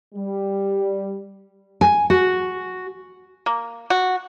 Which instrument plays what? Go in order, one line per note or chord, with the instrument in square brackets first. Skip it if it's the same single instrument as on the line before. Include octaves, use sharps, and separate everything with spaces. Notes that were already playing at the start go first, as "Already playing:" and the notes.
[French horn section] G3
[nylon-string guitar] G#5
F#4
[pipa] A#3
F#4